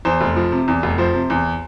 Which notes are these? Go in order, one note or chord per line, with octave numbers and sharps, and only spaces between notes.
E2 C5
F1
F3
C3
E2
F1
F3 C5
C3
E2